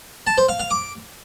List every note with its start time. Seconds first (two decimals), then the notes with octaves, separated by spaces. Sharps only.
0.27 A5
0.38 C5
0.49 F5
0.60 F5
0.71 D6